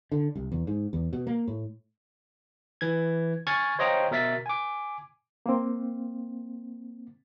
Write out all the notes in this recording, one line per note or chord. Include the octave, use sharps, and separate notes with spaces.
D3
C2
E2
G#2
E2
B2
A#3
A2
E3 G#6
G#5 C#6 F6 G#6 A6
C5 C#5 D#5 F5 G5 A#5
B2 A#4 E5 A6 B6
G#5 D6
A#3 C4